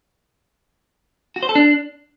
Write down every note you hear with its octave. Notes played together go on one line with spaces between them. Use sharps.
F#4
C5
A4
D4